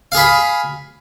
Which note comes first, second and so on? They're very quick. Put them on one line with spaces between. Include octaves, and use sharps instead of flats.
F5 G#4 B5